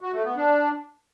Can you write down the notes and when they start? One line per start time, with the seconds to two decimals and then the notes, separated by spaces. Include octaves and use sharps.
0.01 F#4
0.13 A3
0.24 B3
0.36 D4